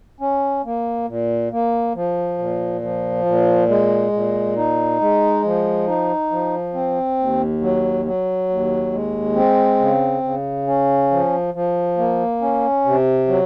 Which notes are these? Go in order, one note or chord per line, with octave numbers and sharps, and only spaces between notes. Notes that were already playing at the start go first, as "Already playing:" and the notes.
C#4
A#3
A#2
A#3
F3
A#2
F3
A#2
G#3
A#2
D#4
G#3
F3
D#4
F3
C4
D#2
F#3
F#3
D#2
G#3
C4
C#3
C#3
C#4
F3
F3
A#3
C#4
C3
F#3